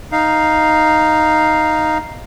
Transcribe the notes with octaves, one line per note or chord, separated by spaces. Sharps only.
D#4 F5